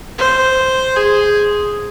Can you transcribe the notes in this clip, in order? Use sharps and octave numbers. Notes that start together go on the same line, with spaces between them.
C5
G#4